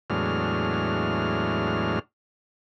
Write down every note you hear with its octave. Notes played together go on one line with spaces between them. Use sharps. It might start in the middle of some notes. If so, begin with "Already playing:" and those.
E2 A2 F#3 G#3 D4 F6